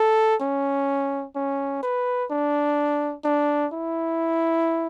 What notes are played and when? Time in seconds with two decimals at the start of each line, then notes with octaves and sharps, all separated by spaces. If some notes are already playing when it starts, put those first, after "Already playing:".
Already playing: A4
0.40 C#4
1.35 C#4
1.83 B4
2.30 D4
3.24 D4
3.72 E4